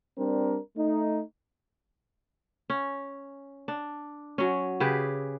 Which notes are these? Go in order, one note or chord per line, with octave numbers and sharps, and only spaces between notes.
G3 C4 D4 A#4
A3 D#4
C#4
D4
F#3 C#4
C#3 G4 G#4 B4